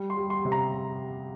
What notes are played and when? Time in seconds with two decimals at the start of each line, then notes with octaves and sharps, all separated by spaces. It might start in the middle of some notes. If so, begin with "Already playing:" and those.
Already playing: G3
0.10 C6
0.17 G3
0.30 C6
0.45 C3
0.52 A#5